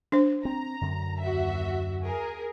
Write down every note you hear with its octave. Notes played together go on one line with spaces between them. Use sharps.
D4 C5
C4 A#5
F#2 D3
D#2 F#4 E5
G#4 A#4